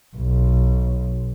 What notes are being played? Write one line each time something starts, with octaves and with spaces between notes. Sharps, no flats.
B1